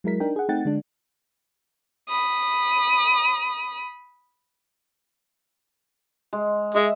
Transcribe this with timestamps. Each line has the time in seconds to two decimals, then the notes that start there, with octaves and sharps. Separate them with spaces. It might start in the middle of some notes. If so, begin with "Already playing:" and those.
0.04 F#3 G#3 E4 A#4 B6
0.20 D4 D#4 A#4 G5
0.36 G#4 F#5
0.49 A3 C4 D#4 F#5 G5 A6
0.65 D3 G#3 D4
2.09 B5 D#6
6.33 G#3
6.75 G#3 D#5 E5